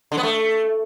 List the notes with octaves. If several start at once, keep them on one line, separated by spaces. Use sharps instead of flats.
D3
B3
A3